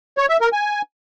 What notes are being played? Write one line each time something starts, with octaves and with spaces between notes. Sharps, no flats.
C#5
E5
A#4
G#5